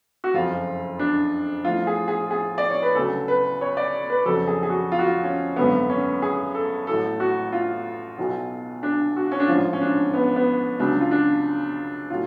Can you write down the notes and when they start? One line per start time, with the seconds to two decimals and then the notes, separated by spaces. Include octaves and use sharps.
0.24 F#4
0.34 F#1 F2 F3 F4
0.99 D4
1.65 A1 A2 F3 F4
1.87 G#4
2.08 G#4
2.31 G#4
2.58 D5
2.70 C#5
2.82 B4
2.95 D2 C#3 F#3 A4
3.28 B4
3.61 C#5
3.77 D5
4.10 B4
4.26 F2 C#3 F#3 A4
4.47 G#4
4.63 G#4
4.70 F#4
4.92 F4
4.99 F#4
5.07 F4
5.23 C#4
5.56 G#1 F#2 D3 F#3 B3
5.90 C#4
6.22 G#4
6.55 A4
6.87 A1 A2 F#3 A4
7.20 F#4
7.52 F4
8.18 B1 B2 F#3
8.83 D4
9.16 F#4
9.32 C#4
9.40 D4
9.48 A1 G#2 F3 F4
9.73 C#4
9.81 D4
10.14 B3
10.36 B3
10.79 C#2 C#3 F#3 D4
11.00 F4
11.11 D4
12.10 A2 F#3 F4